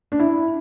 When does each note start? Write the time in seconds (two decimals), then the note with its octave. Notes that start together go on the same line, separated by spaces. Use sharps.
0.12 D4
0.19 E4